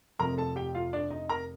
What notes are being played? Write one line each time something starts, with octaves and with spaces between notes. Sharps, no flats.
F1 F2 C3 F3 A#4 A#5
A4 A5
G4 G5
F4 F5
D4 D5
D#4 D#5
A#4 A#5